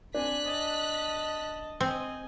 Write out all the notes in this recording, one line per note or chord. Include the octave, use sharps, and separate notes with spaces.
C4 D4 G#5 F#6 B6
D#5 A5
C4 D#5 G#5